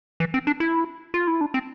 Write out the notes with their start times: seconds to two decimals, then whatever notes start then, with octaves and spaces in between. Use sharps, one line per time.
0.20 E3
0.34 C4
0.47 D4
0.60 E4
1.14 F4
1.27 E4
1.41 D4
1.54 C4